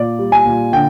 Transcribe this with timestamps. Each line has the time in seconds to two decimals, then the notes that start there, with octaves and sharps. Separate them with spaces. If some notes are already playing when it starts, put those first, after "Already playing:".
Already playing: A#2 D5
0.19 G3
0.32 G#5
0.46 A#2
0.73 D3 G5